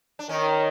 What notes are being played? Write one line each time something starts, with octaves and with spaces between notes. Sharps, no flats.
D4
D#3 C#4